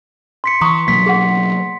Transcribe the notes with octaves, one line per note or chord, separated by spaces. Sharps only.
C6 B6 C#7
E3 A#5 C#6 D#6
B2 F#3 A#3 B6
G#4 F#5